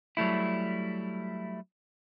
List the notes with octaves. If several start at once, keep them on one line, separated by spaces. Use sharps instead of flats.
F#3 G3 A3 E4